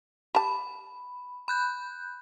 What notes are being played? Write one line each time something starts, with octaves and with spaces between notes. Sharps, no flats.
G4 A5 B5
B5 F#6 G6